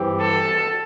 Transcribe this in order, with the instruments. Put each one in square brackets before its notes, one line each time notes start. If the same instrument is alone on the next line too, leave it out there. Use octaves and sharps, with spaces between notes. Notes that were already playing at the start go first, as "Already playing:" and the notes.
Already playing: [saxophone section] G2 E3 C4 E4 G4
[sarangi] A4